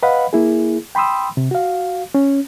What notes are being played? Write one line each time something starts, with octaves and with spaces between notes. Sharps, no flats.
B4 D#5 F5 F#5 B5
A#3 E4 G#4
G5 B5 C6 D#6 E6
C3
F#4 F5
C#4